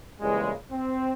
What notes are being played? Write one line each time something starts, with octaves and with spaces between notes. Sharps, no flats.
E2 A#2 C#3 E3 G3 G#3
C4